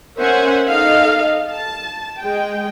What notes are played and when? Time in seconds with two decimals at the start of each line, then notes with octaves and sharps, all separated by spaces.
0.17 C#4 A#4 C5 E5 F#5 G#5
0.69 D#4 A4 D#5 F5
1.49 A5
2.19 G#3 G5